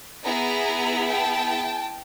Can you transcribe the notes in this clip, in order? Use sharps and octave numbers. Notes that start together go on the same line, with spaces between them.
B3 E4 G#4 G#5 A#5
G5 A5